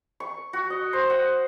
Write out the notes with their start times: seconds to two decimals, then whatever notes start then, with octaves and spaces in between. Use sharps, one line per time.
0.20 C#6
0.53 F#4
0.70 D#5
0.93 C5
1.10 F#5